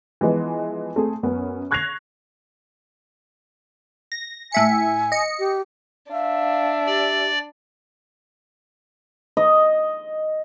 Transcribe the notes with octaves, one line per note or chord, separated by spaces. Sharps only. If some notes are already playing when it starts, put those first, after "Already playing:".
E3 F3 G#3 B3
A3 C4 G#4
F#2 B3 C#4
C#6 F#6 G#6 A#6 C7 F7
A#6
A2 E5 G#5 C#7
D#5 C#7
G4
D4 E5 F5
G4 D5
D#5